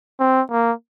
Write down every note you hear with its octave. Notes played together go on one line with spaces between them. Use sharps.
C4
A#3